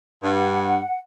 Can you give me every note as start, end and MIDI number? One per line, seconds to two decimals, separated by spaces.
0.23 0.77 43
0.23 0.99 78